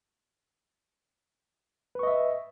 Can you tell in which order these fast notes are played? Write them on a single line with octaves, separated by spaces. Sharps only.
B4 C#6 D#5 E5